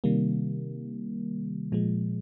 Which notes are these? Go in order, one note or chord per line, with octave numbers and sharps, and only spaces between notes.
C3 D#3 G3 A#3
A#2 F3 G#3